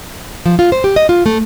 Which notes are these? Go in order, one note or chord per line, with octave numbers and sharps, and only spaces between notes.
F3
F4
C5
G4
D#5
F4
A3